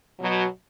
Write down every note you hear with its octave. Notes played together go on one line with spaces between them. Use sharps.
B2 F#3